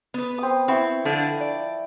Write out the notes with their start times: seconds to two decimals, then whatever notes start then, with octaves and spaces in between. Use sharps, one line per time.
0.14 B3 B4
0.38 C4 D#6
0.68 C4 E4 G5 C#6
1.05 D3 F3
1.41 D5